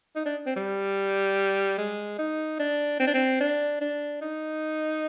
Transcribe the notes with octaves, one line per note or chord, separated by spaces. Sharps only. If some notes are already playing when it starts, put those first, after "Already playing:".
D#4
D4
C4
G3
G#3
D#4
D4
C4
D4
C4
D4
D4
D#4